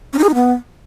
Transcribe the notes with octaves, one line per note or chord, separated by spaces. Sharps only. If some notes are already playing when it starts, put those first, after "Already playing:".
C#4
D#4
G#4
D#4
B3